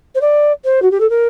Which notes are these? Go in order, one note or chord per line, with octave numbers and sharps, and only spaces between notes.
C5
D5
C5
F#4
G4
A4
A#4